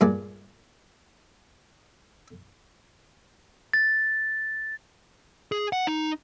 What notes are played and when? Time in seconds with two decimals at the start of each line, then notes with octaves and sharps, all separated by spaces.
0.01 G2 A#2 G#3 D5
3.73 A6
5.52 G#4
5.73 F#5
5.87 D#4